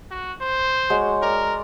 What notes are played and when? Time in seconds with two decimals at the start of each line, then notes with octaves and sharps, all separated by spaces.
0.11 F#4
0.41 C5
0.90 G#3 F#4 C#5
1.22 A#4 D5